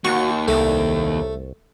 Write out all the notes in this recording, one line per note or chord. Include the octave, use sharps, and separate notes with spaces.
D#2 F#4 C#6
C2 A3